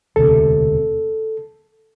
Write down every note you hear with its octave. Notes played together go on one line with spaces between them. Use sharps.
E1 D2 C3 A4